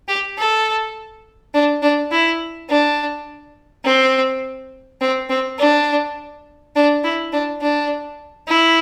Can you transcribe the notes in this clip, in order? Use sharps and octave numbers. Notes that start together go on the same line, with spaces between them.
G4
A4
D4
D4
E4
D4
C4
C4
C4
D4
D4
E4
D4
D4
E4